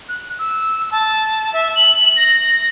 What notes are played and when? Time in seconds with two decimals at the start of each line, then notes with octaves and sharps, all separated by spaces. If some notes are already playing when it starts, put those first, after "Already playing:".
0.09 F#6
0.39 E6
0.92 A5
1.53 E5
1.76 F#7
2.16 A#6